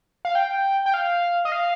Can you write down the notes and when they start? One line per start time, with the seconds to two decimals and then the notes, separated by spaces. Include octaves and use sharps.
0.25 F5
0.35 G5
0.86 G5
0.94 F5
1.45 D#5
1.52 F5